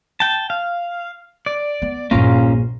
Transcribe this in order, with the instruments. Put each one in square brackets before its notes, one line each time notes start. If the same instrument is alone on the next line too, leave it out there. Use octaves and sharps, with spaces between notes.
[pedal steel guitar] G5 A5
F5
D5
[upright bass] B3
[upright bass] A#1 G2 [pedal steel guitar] A#3 C#4 F4